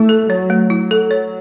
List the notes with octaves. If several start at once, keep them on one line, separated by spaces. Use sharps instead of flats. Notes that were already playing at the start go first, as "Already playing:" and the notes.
Already playing: A3 E4
A4
F#3 C#5
A3
F#3 E4
A4
C#5